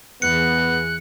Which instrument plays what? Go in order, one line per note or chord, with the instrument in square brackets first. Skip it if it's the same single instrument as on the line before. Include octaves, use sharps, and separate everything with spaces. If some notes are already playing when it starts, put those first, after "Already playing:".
[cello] E2 G#4 [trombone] B3 [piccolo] F#6 [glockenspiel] C#7